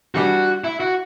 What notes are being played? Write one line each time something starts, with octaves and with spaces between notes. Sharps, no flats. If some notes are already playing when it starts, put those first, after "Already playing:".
E3 G3 D4 F#4 G4
E4
F#4